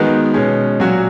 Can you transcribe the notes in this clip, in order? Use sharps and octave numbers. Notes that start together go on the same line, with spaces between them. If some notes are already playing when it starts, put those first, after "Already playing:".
Already playing: D#3 G#3 B3 D#4 F#4
B2 G#3 C#4
A#2 F#3 C#4 F#4